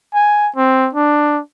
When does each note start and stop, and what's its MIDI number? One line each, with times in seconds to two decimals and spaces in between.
0.14 0.49 80
0.56 0.89 60
0.94 1.40 62